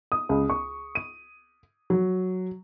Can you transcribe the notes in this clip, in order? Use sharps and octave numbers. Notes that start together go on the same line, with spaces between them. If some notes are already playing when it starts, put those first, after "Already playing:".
D#6
C#2
C#6
D#7
F#3